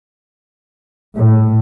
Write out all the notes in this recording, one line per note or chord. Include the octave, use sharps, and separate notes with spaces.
A2